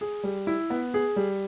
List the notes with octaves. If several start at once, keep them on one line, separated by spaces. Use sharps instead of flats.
G#4
G3
E4
B3
G#4
G3